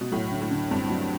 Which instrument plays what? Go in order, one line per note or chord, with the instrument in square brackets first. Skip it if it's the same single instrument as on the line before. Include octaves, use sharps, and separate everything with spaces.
[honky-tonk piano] B2
[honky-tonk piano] A2 [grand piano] F#3
[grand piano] D3
[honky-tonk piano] A2
[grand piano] D3
[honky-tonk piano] G2 [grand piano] C4
[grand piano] F#3